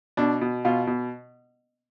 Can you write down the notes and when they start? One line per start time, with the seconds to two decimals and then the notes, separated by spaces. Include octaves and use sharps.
0.17 B2 D4
0.42 B2
0.65 B2 F4
0.87 B2